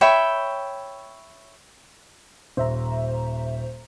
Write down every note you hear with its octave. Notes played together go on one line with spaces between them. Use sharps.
C#5 E5 G5 B5
D#1 C5 E5 A#5